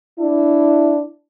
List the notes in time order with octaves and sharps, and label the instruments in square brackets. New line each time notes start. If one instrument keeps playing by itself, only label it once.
[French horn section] D4 E4